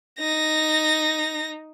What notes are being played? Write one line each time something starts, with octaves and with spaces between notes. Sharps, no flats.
D#4 A#6